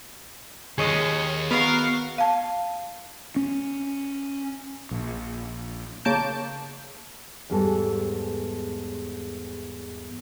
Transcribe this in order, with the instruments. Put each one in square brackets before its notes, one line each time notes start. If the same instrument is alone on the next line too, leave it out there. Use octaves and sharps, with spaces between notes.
[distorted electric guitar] D#2 [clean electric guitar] G#4 C#5 D#5
[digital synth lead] B3 [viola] F#4 F5 [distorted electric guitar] A#4
[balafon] F5 A5
[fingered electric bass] C#4
A#1
[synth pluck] C#3 A#3 A5 G6 D7
[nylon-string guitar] E2 G#2 G3 B3 A4 A5